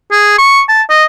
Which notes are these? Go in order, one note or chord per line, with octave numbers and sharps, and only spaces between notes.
G#4
C#6
A5
D#5